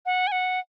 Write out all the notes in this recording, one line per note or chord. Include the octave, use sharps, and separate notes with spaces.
F#5
G#5
F#5